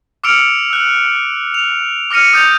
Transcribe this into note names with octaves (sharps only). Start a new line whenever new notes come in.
D6 E6 F6 C#7 D7 F7
E6 F#6
F7
D6 F6 A#6 C#7 D#7
D#6 G6 A6 F7